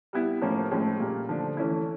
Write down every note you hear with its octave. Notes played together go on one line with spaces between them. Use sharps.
G3 B3 E4
A2 F3 A#3 C#4
A2 F3 G#3 C#4
A#2 G3 A#3
D3 F3 A3 D4
E3 A3 C#4 E4